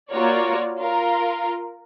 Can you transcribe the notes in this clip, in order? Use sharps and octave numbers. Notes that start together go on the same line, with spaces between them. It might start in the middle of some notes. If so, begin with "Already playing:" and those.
A#3 F4 F#4 A#4 C#5 D5
F4 A#4